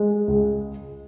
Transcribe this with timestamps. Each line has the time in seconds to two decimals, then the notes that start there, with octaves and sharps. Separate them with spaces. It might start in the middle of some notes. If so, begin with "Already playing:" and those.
Already playing: G#3
0.28 C#2